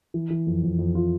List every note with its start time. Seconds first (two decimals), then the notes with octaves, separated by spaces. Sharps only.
0.14 E3
0.30 E3
0.47 F2
0.63 F2
0.79 F2
0.95 F4